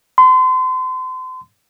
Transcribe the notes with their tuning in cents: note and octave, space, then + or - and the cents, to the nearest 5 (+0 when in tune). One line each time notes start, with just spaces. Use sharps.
C6 -35